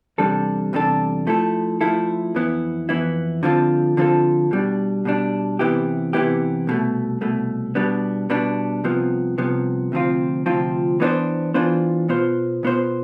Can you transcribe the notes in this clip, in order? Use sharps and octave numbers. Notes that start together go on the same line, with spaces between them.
E2 C3 G3 D4 A4
E2 C3 G3 D4 A4
F3 A3 E4 A4
F3 A3 E4 A4
F2 E3 B3 E4
F2 E3 B3 E4
D3 F3 C4 F4 A4
D3 F3 C4 F4 A4
B2 G3 D4
B2 G3 D4
C3 E3 B3 E4 G4
C3 E3 B3 E4 G4
C2 B2 A3
C2 B2 A3
B2 G3 B3 D4
B2 G3 B3 D4
C2 C3 F3 B3
C2 C3 F3 B3
D2 C3 F3 C4 F4
D2 C3 F3 C4 F4
E3 B3 D4 F4 C5
E3 B3 D4 F4 C5
B2 B3 F4 C5
B2 B3 F4 C5